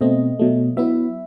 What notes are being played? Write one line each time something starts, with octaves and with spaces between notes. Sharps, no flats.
B2 A3 C4 D#5
B2 F#3 A3
F#3 B3 E4 E5